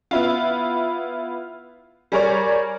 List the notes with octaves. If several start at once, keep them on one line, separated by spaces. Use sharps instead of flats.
B3 E4 F4
G3 G#4 A#4 C#5 D5